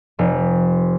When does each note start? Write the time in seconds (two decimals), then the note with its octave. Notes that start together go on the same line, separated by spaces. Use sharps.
0.19 F1